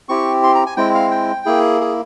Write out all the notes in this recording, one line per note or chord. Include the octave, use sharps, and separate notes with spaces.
C4 E4 G4 C#6
C6
A#5
G#5
G#3 C4 E4 G5
F5
G5
A#3 E4 G#4
G#4